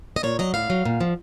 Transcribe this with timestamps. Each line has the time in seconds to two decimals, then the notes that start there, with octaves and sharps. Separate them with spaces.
0.16 D#5
0.23 A#2 C#5
0.39 F#3 D#5
0.54 A2 F5
0.70 F#3
0.85 A#2
1.01 F3